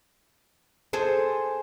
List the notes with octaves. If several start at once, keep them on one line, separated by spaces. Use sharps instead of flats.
G#4 A4 C5